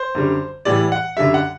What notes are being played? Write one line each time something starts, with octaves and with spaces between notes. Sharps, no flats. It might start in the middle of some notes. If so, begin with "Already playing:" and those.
Already playing: C5
F#2 D3 G3
A2 E3 G3 D5
F#5
F#2 D3 G3 E5
F#5